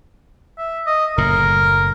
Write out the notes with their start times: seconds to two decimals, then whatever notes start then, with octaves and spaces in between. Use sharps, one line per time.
0.58 E5
0.87 D#5
1.18 F#1 A2 A#4